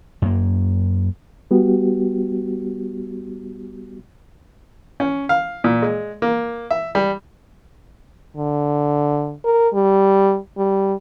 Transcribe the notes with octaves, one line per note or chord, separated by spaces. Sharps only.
F#2 A#3
G3 B3 F#4 G4
C#4
F5
A#2
G#3
A#3
E5
G3
D3
A#4
G3
G3